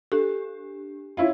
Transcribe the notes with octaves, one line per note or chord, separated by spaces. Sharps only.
D4 G4 A4
C#4 E4 F4